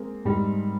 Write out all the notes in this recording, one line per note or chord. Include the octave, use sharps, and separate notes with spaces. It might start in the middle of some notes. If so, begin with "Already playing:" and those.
Already playing: G#3 A#3 C4
G#2 G3